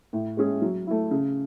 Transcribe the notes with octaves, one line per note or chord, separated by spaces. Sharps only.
A2
G#3 C#4 G#4
F#3
A3 E4
C#3